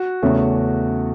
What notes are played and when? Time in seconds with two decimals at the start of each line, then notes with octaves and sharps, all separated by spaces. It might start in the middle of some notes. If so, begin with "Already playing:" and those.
Already playing: F#4
0.22 E2 C#3 A3 C#4